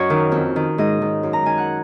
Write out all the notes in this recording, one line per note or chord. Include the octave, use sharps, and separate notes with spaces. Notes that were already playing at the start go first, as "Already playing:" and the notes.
Already playing: F#2 C#5 D#5
D#3
F2
D#3
G#2 D#5
D#3
F#2
A#5
D#3 G#5
F#5